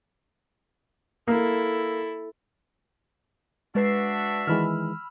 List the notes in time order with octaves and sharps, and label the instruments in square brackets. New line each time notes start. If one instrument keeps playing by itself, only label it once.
[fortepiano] A#3 [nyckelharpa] E4 A4
[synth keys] G#3 B4 C7 [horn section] D4 F#4 E5
[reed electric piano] D#3 E3 G#3 [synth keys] B5 E6 F6